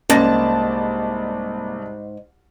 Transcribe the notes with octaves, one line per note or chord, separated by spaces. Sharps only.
C2 G#2 A#3 C#4 D5 A5 A6 A#6